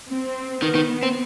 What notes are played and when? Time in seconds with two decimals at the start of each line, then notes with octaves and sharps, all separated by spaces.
0.09 C4
0.62 D#3 B3
0.75 D#3
1.03 C4